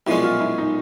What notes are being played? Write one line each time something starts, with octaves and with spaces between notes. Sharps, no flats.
B1 A#2 F3 G#3 C#4 E4
F4
E4
D#4